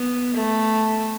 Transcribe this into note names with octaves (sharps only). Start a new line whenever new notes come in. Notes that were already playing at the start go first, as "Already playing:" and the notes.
Already playing: B3
A3